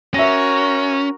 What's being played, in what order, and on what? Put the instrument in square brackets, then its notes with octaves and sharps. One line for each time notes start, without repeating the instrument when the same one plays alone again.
[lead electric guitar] C#4 [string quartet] F#4 A#4 [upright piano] E5 A#6